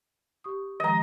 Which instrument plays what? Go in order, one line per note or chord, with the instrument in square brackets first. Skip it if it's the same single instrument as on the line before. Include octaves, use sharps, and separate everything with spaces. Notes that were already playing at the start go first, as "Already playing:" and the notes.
[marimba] G4 C#6 D#6
[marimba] D#3 F3 G#3 [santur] D#5 A#5